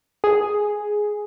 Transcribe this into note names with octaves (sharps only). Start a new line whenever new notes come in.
G#4